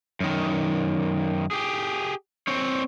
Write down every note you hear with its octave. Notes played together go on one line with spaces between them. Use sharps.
F#2 D#3
G4 G#4
C4 C#5